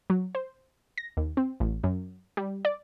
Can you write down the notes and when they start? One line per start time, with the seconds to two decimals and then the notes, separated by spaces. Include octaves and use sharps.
0.10 F#3
0.35 C5
0.98 A#6
1.17 D#2
1.37 C4
1.60 A1
1.84 F#2
2.37 G3
2.65 D5